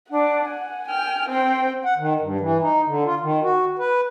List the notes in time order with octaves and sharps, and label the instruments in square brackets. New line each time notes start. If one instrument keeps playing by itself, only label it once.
[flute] D4 [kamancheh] F#5
[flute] G#5
[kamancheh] G5 F6
[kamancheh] C4 G5 [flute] C5
[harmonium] F#5
D#3
G2
E3
D#4
D3
F4
D#3
F#4
B4